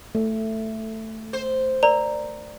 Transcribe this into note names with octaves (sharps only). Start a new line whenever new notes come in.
A3
C5
A#4 D5 A#5